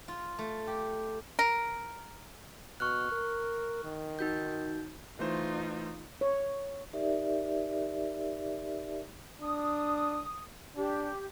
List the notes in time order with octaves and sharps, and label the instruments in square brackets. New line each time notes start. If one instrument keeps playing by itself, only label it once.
[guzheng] F4
A3
G4
[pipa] A#4
[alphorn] B2 [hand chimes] C#6 F6 F#6
[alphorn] A#4
D#3
[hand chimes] D#4 F#4 G6
[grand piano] E3 A3 C5 [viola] D#4 F4
[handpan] C#5
[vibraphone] D#4 G4 A#4 D5 E5
[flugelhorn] D4 [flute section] D#6
[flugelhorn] D4 [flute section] G4